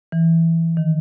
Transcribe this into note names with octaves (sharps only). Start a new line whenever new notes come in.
E3
D#3